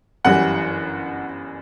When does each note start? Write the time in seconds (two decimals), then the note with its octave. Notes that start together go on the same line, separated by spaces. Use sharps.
0.24 G1 F#2 E3 G3 F#5